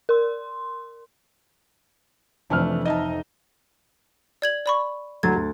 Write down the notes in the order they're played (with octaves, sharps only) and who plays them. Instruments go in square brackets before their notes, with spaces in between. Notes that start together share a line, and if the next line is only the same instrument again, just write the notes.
[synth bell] A#4 C6
[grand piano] F1 F2 F6 [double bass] E3 [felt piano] A3 D4
[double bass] D#4 [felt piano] D#5 E5 A5
[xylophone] D5 G#6 F#7
D5 B5 C#6
[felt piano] D2 F#3 A6 [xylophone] G#6
[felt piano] D2